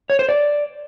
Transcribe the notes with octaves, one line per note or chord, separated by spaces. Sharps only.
C#5
C5
D5